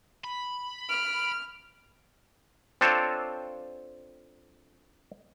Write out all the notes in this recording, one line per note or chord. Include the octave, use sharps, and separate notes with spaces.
B5
F6 D7
C4 D4 F4 A4 C5 C#5